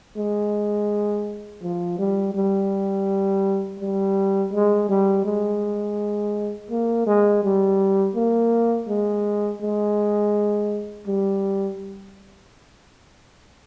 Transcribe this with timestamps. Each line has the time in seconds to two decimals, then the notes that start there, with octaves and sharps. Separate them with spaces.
0.17 G#3
1.62 F3
1.98 G3
2.34 G3
3.80 G3
4.53 G#3
4.89 G3
5.25 G#3
6.70 A#3
7.06 G#3
7.43 G3
8.15 A#3
8.88 G#3
9.62 G#3
11.07 G3